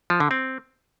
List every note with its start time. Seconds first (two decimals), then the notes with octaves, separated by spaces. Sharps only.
0.10 F3
0.20 D3
0.31 C4